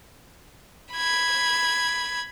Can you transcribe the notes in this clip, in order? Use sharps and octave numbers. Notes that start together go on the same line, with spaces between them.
B5 G#6